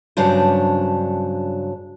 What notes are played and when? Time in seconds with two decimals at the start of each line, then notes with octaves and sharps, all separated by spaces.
0.17 G2 C#3 F#3 D4 B4 C5